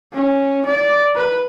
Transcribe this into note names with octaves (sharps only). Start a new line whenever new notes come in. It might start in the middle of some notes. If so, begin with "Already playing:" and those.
C#4
D5
B4